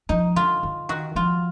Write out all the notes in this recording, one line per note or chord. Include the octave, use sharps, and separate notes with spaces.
F3 D#4
D3 F4
D3
D#3 F#4
F3 F4